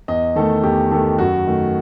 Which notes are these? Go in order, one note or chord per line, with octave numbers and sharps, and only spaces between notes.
E2 D#5
D#3 A3 A4
E2 G4
D#3 A3 A4
F#2 F#4
D#3 A3